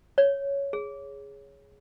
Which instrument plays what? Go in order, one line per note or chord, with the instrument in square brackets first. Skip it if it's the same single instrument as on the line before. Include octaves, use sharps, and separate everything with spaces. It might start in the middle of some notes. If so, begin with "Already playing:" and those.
[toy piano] C#5
G#4